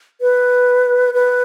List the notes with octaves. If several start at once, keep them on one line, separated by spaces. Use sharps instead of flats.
B4
B4